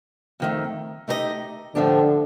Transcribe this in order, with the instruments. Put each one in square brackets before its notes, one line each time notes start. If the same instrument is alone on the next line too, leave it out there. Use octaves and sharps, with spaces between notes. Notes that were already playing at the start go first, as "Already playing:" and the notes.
[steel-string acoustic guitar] F2 D#3 A3
A3 D#4 G4 A#4 D#5
[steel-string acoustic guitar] A2 F3 A3 D4 G4 [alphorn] D3